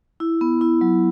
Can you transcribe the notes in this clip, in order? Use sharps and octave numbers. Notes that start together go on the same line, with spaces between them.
E4
B3
E4
F#3